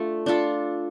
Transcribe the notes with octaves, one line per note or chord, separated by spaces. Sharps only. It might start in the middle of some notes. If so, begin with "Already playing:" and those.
Already playing: A3 D4 F4
D4 F4 A4